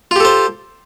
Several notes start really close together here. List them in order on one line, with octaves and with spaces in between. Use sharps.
F4 G4 A4 C5